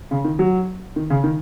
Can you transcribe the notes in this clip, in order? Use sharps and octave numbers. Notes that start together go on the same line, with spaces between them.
C#3
D#3
F#3
D#3
C#3
D#3